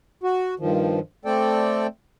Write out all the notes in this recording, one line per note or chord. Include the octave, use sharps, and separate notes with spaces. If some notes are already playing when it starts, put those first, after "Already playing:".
F#4
G2 D#3 F3
A3 C4 A4 D5 G5